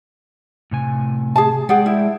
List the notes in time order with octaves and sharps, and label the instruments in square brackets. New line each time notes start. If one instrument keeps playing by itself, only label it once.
[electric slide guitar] A2 C3 G#5
[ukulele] G#4 A5
[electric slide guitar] G#3 D5 G5 [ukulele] G#4 F#5
[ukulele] E4